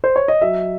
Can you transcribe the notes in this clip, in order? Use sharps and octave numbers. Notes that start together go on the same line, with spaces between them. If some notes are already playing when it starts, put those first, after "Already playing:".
C5
C#5
D#5
F#3 E5